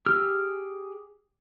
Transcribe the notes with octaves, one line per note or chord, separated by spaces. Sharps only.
G4 G#4 E6 F6